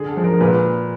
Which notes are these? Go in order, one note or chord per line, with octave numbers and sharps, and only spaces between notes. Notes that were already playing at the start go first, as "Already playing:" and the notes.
Already playing: D3 G#4
A4
F3 G#3
A#4
A#2 B4